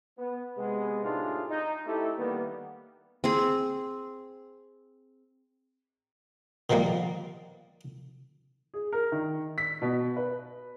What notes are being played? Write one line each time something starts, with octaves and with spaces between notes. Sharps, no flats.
B3
C3 G#3 B3
A2 C3 D4 D#4 F4 G#4
D#4
A3 C4 D#4 E4 G4 A4
D#3 E3 G3 A#3 B3
C4 G#4
D3 D#3 F3 G3 A#3
G#4
A#4
D#3
B6
B2
B4